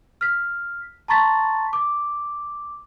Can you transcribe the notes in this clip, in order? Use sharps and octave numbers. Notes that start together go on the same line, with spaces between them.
F6 B6
A5 A#5 C6 C#6 A6 B6
D6